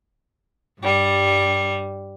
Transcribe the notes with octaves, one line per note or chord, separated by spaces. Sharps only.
G2 G3